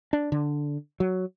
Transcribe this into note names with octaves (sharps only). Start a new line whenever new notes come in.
D4
D3
F#3